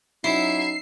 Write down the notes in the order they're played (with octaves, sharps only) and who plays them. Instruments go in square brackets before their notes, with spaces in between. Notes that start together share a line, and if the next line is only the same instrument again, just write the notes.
[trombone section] F#3 C#4 D#4 [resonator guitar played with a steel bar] E4 [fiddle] E5 [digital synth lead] C7